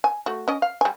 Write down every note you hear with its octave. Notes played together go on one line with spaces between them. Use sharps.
G#5
A3 F#4
C#4 D#5
F5
G3 G#5